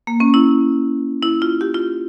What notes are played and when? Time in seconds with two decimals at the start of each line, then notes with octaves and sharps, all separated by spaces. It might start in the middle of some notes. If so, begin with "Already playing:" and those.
0.07 A#3
0.20 C#4
0.34 E4
1.23 E4
1.42 F4
1.61 G4
1.74 F4